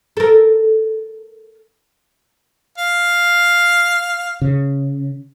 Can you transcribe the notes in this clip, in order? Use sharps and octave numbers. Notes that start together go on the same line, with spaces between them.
A4 A#4
F5
C#3